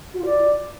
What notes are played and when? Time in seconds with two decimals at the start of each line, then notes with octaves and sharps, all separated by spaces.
0.14 F#4
0.20 F4
0.25 D5